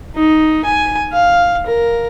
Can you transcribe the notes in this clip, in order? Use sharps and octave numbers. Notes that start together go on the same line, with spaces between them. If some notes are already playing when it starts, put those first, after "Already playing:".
D#4
G#5
F5
A#4